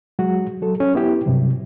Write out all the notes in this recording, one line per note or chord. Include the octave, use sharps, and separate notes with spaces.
F#3 G#3 F#4
F#3 A4
C#4
B3 E4 G4
G2 C3 F#3